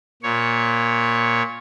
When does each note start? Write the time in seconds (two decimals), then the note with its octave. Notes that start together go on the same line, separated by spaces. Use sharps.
0.23 A#2 C#5